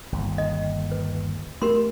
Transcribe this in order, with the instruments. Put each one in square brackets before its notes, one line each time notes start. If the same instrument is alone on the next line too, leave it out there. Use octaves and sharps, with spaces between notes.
[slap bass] G1 D#2
[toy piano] D#5
B4
[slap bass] A3 [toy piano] G4 A#4 C6